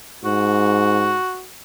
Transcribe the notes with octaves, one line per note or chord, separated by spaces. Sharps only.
G#2 F#4